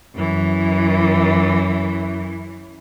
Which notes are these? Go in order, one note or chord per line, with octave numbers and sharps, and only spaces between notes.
F#2 E3